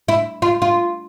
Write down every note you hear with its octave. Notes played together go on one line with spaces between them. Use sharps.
E4
F4
F4